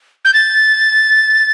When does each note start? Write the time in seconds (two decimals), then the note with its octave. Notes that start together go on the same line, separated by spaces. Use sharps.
0.25 G6
0.34 A6